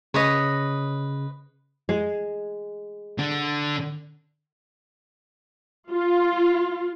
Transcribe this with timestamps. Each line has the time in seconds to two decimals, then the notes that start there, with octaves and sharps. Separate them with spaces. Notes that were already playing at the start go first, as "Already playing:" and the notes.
0.14 C#3 B4 C#5 D#5
1.89 G#3
3.19 D3
5.90 F4